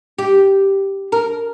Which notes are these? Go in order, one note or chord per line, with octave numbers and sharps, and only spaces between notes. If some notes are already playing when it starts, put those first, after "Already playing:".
G4
A#4